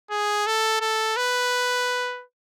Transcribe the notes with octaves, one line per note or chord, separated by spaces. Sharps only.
G#4
A4
A4
B4